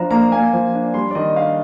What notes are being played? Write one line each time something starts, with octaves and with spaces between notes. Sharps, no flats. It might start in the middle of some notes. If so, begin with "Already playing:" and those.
Already playing: F3 D4 A#5
A#3 A#5
A#3 G#5
F3
D4
G3 C6
D5
D#3 D#5
D4 F5